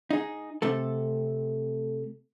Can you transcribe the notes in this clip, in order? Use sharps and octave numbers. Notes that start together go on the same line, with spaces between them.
D#4 G#4
C3 A3 A4